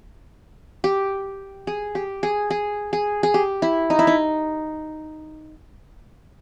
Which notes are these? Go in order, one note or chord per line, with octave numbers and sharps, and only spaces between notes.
G4
G#4
G4
G#4
G#4
G#4
G#4
G4
E4
D#4
E4
D#4